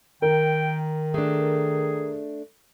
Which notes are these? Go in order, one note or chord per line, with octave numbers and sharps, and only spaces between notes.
D#3 A#4 G5
A3 D4 G#4